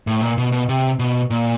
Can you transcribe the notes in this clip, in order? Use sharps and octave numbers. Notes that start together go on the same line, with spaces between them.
A2
A#2
B2
B2
C3
B2
A#2